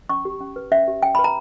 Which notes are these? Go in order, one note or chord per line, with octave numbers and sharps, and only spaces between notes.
C#4 C#6
G4
C#4
B4
C#4 E5
G4
C#4 G5
B4 B5
A#5